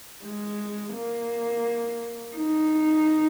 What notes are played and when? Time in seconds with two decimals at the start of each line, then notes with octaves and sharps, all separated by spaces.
0.22 G#3
0.94 A#3
2.36 D#4